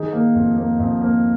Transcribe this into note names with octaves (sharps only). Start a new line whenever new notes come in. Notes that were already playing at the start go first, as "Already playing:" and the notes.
Already playing: D#3 D#4 G#4
A#3
F2
A#3
F2
A#3